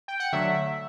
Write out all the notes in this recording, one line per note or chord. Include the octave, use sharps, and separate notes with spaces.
G5
F#5
D3 F#3 A3 E5